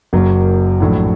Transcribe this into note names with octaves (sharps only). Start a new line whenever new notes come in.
F#1 F#2 F#3 A#3
A#1 A2 F#3